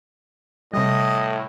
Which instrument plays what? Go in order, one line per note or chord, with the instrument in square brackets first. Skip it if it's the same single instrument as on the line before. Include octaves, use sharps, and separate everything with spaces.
[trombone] A2 [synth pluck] C3 G3 [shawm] D#5